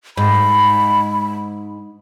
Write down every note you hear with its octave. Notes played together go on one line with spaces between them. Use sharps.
G#2 B5